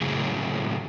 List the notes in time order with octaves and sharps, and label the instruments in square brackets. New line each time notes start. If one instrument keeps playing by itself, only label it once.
[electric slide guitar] F#2 A2 C#3 G#4